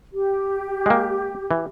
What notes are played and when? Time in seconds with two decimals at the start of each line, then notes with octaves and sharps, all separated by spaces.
0.12 G4
0.86 G#3 A#3
1.51 E3